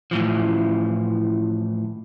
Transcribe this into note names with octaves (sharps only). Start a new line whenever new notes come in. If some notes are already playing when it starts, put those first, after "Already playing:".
A2 E3 F3